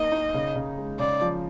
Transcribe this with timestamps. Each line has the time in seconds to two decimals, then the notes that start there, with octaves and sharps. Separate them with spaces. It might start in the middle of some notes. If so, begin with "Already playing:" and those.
Already playing: A#3 D#4 D#5
0.12 D#4
0.34 C#3
0.56 C#3
0.78 G#3
0.99 C#3 D5
1.21 F3